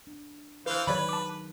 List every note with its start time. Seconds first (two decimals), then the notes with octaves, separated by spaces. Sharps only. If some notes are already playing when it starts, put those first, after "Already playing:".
0.07 D4
0.66 E3 B4 C5 F5 F#6
0.87 D#3 F#3 G#4 B4 C#5 D5 B5
1.09 A5 D6